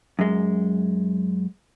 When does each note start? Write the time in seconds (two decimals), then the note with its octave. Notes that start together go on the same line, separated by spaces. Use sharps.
0.19 F#2 G#3